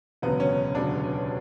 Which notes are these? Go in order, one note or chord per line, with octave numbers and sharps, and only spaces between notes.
E1 D2 C#3 F#3 B3
C#4
E1 D2 C#3 F#3 D4